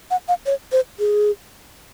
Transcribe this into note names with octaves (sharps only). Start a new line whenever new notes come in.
F#5
F5
C#5
C5
G#4